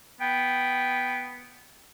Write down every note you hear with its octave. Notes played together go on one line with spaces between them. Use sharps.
B3 G5